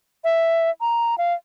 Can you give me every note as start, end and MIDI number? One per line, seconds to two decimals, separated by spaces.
0.24 0.70 76
0.81 1.17 82
1.18 1.33 77